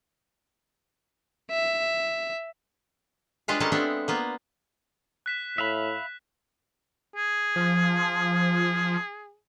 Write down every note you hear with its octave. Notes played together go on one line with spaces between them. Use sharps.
E5
G3 G#3 D4 F4 B4 F5
G3 G#3 C#4 A4 A#4 A5
G#3 B3 C4 D4 A4 E5
A#3 B3 F4
F#6 B6 E7
A2 E5 F5 B5
G#4
F3